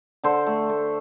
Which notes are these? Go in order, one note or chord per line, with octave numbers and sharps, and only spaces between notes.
D3 A4 C5
A3
A3